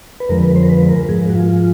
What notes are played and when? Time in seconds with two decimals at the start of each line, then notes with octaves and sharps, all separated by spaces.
0.20 B4
0.29 F2 D3 F3 G#3 A#4
0.43 B4
0.56 C5
0.63 A#4
0.69 B4
0.89 A#4
1.08 G#2 F3 G#3 G#4
1.30 F#4
1.35 F4